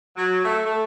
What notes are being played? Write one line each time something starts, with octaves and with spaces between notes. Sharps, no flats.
F#3
A3
A3